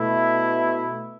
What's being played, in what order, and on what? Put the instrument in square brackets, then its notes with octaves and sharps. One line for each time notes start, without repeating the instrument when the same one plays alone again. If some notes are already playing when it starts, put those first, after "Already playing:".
Already playing: [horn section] B2 A3 E4